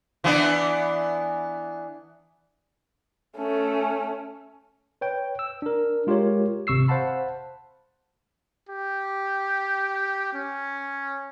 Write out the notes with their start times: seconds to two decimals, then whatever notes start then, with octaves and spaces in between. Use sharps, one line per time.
0.24 E3 B3 D4
3.38 A3 C#4
5.01 B4 C#5 G5
5.39 E6
5.62 D4 A#4
6.07 G#3 F4 G4 A#4 C#5
6.67 G#1 C3 C#6 E6 C7
6.88 C5 F5 F#5 A5 B5
8.69 G4
10.33 C#4